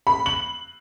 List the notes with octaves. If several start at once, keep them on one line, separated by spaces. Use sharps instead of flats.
B5
F#7